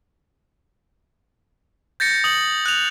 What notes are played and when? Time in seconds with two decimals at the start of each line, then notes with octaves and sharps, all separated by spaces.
2.00 G6 A6 A#6 C#7
2.24 D#6 F#7
2.66 F#6 F7